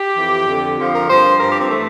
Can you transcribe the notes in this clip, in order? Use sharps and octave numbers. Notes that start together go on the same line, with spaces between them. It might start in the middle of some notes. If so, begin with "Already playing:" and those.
Already playing: G4
F2 E3
F2 D3 F3
F2 D3 F3
A#4
G2 F3 C5
G2 F3 A#4
G4
C4
E3 A3